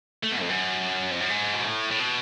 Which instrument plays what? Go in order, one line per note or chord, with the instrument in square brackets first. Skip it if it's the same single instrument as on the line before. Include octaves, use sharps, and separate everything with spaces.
[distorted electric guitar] A3
B2
F2
F#2
F2
F#2
G#2
B2
A2
A2
B2